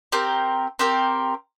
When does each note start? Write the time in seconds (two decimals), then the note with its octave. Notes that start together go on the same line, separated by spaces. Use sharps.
0.12 C4 G4 A#4
0.79 C4 G4 A#4